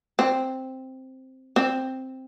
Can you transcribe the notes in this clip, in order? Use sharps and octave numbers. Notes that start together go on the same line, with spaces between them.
C4
C4